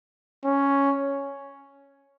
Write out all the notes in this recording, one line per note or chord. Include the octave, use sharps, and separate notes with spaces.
C#4